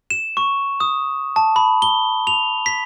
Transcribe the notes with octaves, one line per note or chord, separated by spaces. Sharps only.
E7
C#6
D#6
A5
B5
G7
F7
B6